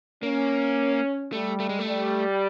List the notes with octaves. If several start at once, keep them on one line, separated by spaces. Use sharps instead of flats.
A#3 C#4
G3 A3
A3
G#3
A3
G3